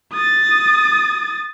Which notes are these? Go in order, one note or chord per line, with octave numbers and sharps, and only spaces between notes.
D#6 A6